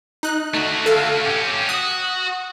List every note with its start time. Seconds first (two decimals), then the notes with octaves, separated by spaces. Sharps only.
0.23 D#4 F#6
0.54 A3 F#4
0.86 A4 F5
1.25 C#4 G4
1.69 F#4 D#6